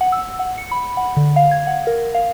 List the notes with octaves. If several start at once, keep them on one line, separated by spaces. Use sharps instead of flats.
F#5
E6
F#5
C#7
B5
F#5
D3
F5
G#6
F#5
A#4
F5